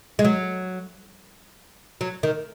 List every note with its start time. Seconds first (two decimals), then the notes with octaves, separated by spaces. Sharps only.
0.19 G#3
0.25 F#3
2.01 F#3
2.23 D#3